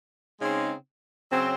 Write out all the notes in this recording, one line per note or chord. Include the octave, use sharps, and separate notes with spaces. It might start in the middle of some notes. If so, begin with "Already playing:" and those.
C#3 G#3 C4 D#4
C#3 F#3 C4